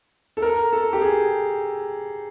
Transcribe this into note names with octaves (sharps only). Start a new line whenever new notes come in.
A4
A#4
A4
G4
G#4